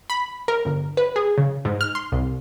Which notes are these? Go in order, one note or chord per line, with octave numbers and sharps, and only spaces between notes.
B5
A#4
G1
B4
G#4
C#3
G#2
F6
C6
C2